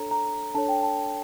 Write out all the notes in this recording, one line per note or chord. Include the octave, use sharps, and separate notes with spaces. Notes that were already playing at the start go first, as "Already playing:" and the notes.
Already playing: D4 A4 C#5 A#5
A#5
D4 A4 C#5 A5
G5
A5